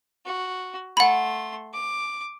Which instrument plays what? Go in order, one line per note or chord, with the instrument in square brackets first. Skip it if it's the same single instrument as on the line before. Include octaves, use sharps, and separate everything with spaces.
[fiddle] F#4
[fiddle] A3 C6 [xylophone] F#5 B5
[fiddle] D6